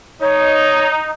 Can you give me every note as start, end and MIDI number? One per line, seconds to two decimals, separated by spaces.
0.21 1.11 63
0.21 0.86 73